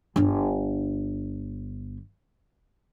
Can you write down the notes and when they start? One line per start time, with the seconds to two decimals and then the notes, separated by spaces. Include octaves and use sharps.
0.16 G1 D4